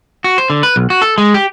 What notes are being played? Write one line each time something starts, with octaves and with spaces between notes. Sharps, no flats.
F#4
C5
D3
B4
B1
F#4
A4
G#3
G4